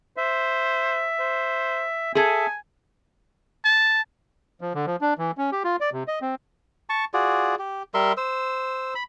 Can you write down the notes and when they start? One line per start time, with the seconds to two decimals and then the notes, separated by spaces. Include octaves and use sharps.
0.17 C5 E5
1.19 C5
2.15 G#4 A4 E5 G#5
3.65 A5
4.61 F3
4.74 D3
4.86 F3
5.01 D4
5.18 E3
5.38 C#4
5.52 G4
5.64 F4
5.81 D5
5.93 C3
6.08 D#5
6.21 C4
6.89 A5 C#6
7.14 F4 F#4 G#4 D5
7.59 G4
7.94 G3 A#4 E5 C6
8.17 C5 E6
8.95 B5